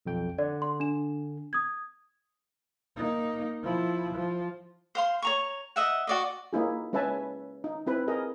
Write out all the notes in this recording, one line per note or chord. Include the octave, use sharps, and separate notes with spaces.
B1 F2 G5
D3 D5
C6
D4 E7
D#6 G#6
A#3 D#4
F3 E4
F3
C5 F5 C6
C#5 A#5 C#6
D#5 E5 F#5
F#4 D5 D#5
A#3 D#4 E4 G#4
G#3 C#4 B4 E5 G#5 A5
D#4
C4 E4 B4
G#4 A#4 D#5